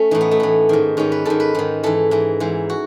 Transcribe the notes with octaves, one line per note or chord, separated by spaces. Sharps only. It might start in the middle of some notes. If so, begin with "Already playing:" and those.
Already playing: A3 C#4
A2 E3 D#4
B3
A3
A2 E3
G#2 D#3
G#2 D#3 C#4
B4
G#2 D#3 A4
B4
G#2 D#3
G#2 E3 A4
G#2 E3
G#2 E3
F#4